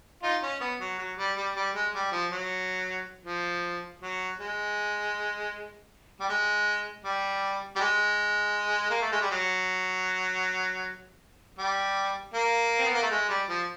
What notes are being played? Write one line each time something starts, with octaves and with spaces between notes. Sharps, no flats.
D#4 F4
C#4
B3
F#3
F#3
G3
G3
G3
G#3
G3
F3
F#3
F3
F#3
G#3
G3
G#3
G3
G3
G#3
A#3
A3
G#3
G3
F#3
G3
A#3
C4
B3
A#3
A3
G#3
G3
F3